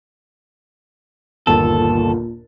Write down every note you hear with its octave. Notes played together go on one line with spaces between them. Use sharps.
G1 D#2 A#2 A4 A5